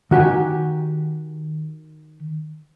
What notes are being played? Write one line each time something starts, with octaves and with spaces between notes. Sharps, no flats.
D#3 F#4 G4 G5 G#5